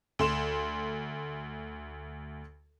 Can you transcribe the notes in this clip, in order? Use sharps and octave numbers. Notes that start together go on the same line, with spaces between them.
D2 C6 E7